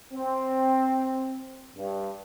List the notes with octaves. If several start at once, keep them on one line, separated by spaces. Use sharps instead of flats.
C4
G2